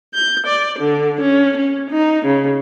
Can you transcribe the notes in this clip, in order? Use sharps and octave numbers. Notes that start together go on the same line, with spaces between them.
G6
D5
D3
C#4
C#4
D#4
C#3